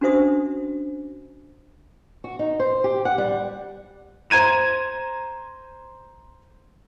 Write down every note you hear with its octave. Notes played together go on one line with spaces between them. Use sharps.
C#4 D4 F#4 C5 E5 D#6
F#4
D#4
C5
G4
F#5
G3
C5 A#5 G#6 D#7 E7